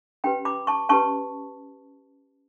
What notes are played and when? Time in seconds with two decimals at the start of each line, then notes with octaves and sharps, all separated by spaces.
0.24 C#4 G4 B4 G5 B5
0.45 B5 D6
0.67 A5 C#6
0.89 C#4 G4 B4 A5 C#6